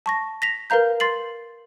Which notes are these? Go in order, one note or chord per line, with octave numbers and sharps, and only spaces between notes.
A5 C#6 A#6
A#6 B6 F7
A#4 B4 F5 A#5 G6
C6 A6 C7 F#7